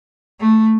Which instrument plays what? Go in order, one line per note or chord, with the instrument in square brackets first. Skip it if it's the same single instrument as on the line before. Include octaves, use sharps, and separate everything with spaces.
[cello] A3